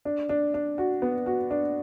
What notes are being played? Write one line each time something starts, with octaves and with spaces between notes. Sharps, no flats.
D4
D4
D4
F#4
B3
F#4
D4